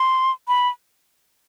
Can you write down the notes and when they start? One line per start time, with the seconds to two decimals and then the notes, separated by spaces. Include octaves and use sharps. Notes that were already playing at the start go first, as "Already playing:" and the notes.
Already playing: C6
0.48 B5